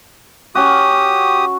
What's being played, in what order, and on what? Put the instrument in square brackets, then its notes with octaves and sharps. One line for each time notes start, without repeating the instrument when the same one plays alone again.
[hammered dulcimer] C#4 F#4 [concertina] G4 D#6